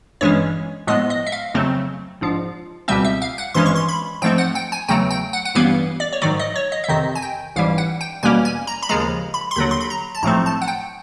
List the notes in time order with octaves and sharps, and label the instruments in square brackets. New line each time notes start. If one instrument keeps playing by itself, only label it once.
[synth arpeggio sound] G1 G2 E3 G#3 C#4 C#5
A2 F3 G#3 B3 D#5
D#5
E5
F5
F2 C#3 F#3 A3 C4
A#1 G#2 F3
C#2 B2 G3 C4 E5
E5
F5
F#5
G#1 G2 E3 G#3 C#4 C6
C#6
C6
B5
G#2 F3 A3 C4 G5
F#5
G5
G#5
E2 C#3 F#3 A3 G5
G5
F#5
F#5
A1 G2 E3 G3 B3 F5
D5
C#5
G#2 D#3 F#3 D5
D#5
C#5
D#5
E5
F2 C3 D#3 D#5
G#5
G5
A1 G#2 E3 G3 F5
F#5
G5
E2 B2 G3 A#3 C#4 G#5
G#5
A#5
B5
D#2 C#3 F3 G#3 A#5
B5
C6
D#2 D3 F#3 B5
C6
B5
A#5
A5
B1 A2 F3 A3 C4 A#5
A5
F#5
G5